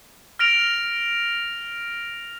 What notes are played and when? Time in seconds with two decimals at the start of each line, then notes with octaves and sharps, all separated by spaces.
0.39 F6 A#6 D7 F7